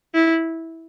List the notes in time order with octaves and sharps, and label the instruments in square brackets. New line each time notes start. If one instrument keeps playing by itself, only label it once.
[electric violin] E4